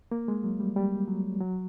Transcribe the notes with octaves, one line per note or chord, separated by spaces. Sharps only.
A#3
G#3
F#3
G3
G3
F#3
F#3